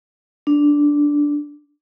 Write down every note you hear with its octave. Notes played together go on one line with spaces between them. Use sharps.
D4